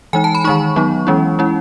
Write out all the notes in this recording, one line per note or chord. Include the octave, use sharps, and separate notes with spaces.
E3 G#3 D#4 G#5
A5
B5
D#3 G#3 D#4 C#6
F#3 B3 D#4
E3 G#3 C#4 E4
G#3 C#4 E4